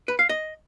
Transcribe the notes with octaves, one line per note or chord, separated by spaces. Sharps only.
B4
F5
D#5